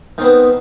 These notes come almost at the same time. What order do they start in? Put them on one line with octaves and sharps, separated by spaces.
D#3 C4 B3